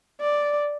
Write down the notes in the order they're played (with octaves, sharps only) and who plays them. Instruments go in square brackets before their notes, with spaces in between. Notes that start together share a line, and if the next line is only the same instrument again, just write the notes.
[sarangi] D5